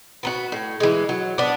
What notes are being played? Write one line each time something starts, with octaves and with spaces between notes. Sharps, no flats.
B3 D#4 F#4
A2
E3 G#3
F#3
B3 D4